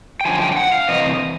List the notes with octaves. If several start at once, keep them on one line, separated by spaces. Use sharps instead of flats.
G5
F#2 D3 F3 G#5
G5
G5
F#5
F5
C3 E3 D#5